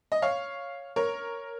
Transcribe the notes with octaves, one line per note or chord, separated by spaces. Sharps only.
D#5
C#5 F5
A#4 C#5